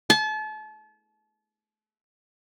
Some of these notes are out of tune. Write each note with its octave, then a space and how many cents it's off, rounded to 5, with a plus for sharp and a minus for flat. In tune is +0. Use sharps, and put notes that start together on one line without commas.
A5 -35